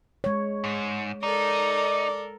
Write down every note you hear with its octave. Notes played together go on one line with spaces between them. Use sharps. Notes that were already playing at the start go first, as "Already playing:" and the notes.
G#3 C#5
G#2
D#4 A4 A#4 D5